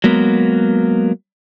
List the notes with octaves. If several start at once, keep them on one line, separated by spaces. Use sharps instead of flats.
F#3 G#3 A#3 B3